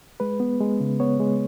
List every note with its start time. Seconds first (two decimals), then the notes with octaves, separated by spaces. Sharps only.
0.20 G#3 B4
0.40 B3
0.60 G#3
0.80 C#3
1.00 B3 C#5
1.20 G#3